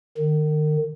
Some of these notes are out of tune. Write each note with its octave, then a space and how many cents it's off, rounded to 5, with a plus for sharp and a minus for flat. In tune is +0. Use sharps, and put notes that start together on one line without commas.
D#3 -35